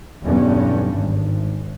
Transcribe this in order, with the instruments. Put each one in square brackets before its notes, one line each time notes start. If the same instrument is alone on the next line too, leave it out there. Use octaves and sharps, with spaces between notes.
[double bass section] B1 E2 G2 G3 C#4
G#1